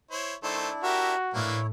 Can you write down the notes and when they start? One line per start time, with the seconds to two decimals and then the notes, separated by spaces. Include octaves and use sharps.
0.11 E4 C5 C#5
0.43 D#3 A3 D4 E4 C5
0.83 F#4 G4 A#4 E5
1.34 A2 E3 A#3 D4 E4 C#5